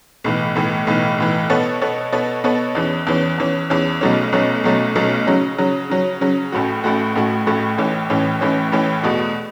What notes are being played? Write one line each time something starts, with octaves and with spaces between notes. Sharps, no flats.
B1 A2 E3
B1 A2 E3
B1 A2 E3
B1 A2 E3
B2 B3 A4 C#5
B2 B3 A4 C#5
B2 B3 A4 C#5
B2 B3 A4 C#5
E2 E3 C#4
E2 E3 C#4
E2 E3 C#4
E2 E3 C#4
B1 B2 F#3 A3 C#4
B1 B2 F#3 A3 C#4
B1 B2 F#3 A3 C#4
B1 B2 F#3 A3 C#4
C#3 F#3 C#4
C#3 F#3 C#4
C#3 F#3 C#4
C#3 F#3 C#4
A1 A2 A3 F#4
A1 A2 A3 F#4
A1 A2 A3 F#4
A1 A2 A3 F#4
A1 A2 E3 C#4
A1 A2 E3 C#4
A1 A2 E3 C#4
A1 A2 E3 C#4
E2 B2 A3 F#4